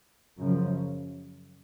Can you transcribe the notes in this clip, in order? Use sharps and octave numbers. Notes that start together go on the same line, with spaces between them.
F#2 C#3 F3